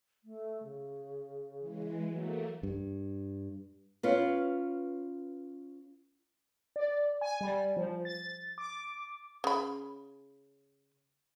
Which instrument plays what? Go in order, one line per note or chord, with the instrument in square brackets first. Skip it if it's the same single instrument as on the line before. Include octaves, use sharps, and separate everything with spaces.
[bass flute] A3
C#3
[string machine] E3 G#3
[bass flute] F#3 [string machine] A3 A#3
[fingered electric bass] G2
[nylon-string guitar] C#4 F4 B4
[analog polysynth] D5
G#5
G3
F3
A6
D6
[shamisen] C#3 B5